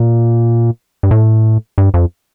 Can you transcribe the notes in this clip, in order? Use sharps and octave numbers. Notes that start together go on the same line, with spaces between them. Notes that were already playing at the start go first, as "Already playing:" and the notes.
Already playing: A#2
G2
A2
G2
F2